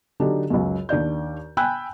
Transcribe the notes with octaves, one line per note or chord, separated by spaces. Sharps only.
D3 F#3 D4 D#4 G4
C#2 F#2
D#2 D4 D5 G6
G5 G#5 B5 E6 F#6 G6